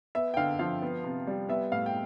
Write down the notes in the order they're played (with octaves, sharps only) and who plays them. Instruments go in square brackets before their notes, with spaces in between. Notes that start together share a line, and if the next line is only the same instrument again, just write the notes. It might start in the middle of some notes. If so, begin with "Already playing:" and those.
[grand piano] B3 E5
G5
D3 F5
F3 F5
B3
C3
G3
B3 E5
A2 F5
G5